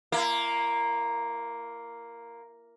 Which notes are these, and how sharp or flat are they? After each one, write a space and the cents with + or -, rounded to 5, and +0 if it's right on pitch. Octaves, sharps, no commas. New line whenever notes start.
A#3 +0 E4 +40